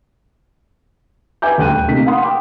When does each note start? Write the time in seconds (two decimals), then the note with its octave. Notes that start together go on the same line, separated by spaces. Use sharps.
1.42 B4 E5 G#5 D6 G6
1.58 D#1 D2 G5 F#6 D#7
1.88 C3 A3 A#3 D#4 B6
2.06 F5 F#5 C6 D#6
2.22 G5 D6